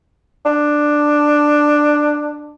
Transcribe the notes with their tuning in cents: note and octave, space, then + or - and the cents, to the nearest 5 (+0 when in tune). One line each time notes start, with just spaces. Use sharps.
D4 +10